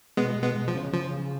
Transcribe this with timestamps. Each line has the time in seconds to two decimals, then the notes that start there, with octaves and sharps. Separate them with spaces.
0.17 B2 G#3 B3
0.36 B2
0.42 G#3 B3
0.55 B2
0.68 F3
0.74 C#3
0.93 C#3 F3